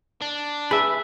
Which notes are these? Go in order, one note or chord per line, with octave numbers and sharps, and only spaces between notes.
D4
G#4 B4 E5